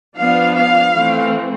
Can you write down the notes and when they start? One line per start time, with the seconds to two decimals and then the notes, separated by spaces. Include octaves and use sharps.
0.17 F3 B3 D4 F5
0.56 F5
0.94 E3 A3 C4